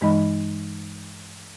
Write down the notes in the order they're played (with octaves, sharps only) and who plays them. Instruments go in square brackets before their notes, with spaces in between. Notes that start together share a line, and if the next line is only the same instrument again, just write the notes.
[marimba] G2 E3 G#3 D#4 D#5 B5